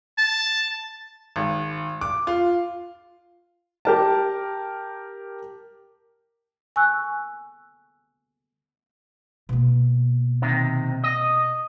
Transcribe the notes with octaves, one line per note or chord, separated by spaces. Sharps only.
A5
G#1
D6
F4
G4 A#4 A5
G#5 C#6 E6 F#6
B2 A#3
C3 D#3
D#5